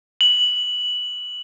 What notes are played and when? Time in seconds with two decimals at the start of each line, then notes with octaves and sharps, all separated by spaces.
0.21 F#7